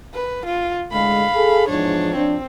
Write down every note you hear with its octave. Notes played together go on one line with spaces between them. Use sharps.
B4
F4
A2 D3 G#3 F5 B5
G#4 A4
E2 G#2 F3 D4 C#5
F3 C4 D4